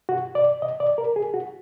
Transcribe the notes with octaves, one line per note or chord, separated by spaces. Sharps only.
F#4
D5
D#5
D5
A#4
G#4
F#4